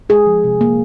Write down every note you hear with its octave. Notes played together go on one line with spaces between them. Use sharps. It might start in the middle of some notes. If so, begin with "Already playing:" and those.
G#3 G#4
F3
C3
A#3